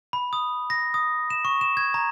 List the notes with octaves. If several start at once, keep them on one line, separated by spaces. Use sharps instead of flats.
B5
D#6
A#6
D#6
E7
C#6
E7
G#6
A#5